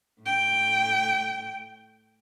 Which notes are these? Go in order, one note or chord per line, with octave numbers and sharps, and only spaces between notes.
A2 G5